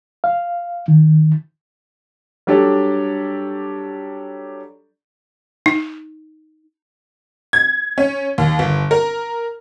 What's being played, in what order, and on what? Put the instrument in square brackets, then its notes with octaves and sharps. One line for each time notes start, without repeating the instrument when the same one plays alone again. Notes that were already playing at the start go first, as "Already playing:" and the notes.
[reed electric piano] F5
D#3
[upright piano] F#3 G3 D4 G4 A4 D5
[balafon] D#4
[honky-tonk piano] G#6
C#4
D#2
G1
A#4